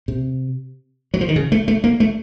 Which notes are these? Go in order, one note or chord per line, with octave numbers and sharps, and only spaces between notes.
C3
F#3
F3
D#3
C#3
A3
A3
A#3
A3